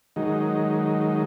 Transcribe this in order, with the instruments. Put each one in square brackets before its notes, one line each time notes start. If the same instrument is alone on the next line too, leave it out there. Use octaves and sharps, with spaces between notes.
[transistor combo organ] D#3 F#3 G#3 D#4